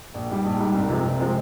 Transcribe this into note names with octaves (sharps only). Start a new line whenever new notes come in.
A#1
G#2 G3
A#1
G#2 G3
C2
C3 F3 G#3 C4
C2
C3 F3 G#3 C4